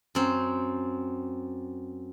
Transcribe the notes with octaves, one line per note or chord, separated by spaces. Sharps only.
F#2 C4